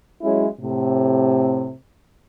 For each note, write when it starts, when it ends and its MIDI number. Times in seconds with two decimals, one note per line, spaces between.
0.22 0.47 54
0.22 0.47 56
0.22 0.47 61
0.22 0.47 64
0.60 1.71 45
0.60 1.71 48